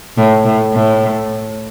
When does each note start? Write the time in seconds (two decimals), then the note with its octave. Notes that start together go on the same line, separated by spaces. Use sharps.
0.17 A2
0.45 A2
0.74 A2